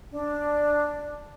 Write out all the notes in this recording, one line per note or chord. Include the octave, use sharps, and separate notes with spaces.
D4